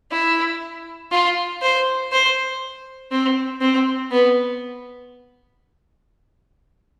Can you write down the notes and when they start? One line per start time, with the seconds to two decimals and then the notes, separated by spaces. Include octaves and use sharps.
0.11 E4
1.12 F4
1.62 C5
2.12 C5
3.12 C4
3.61 C4
4.11 B3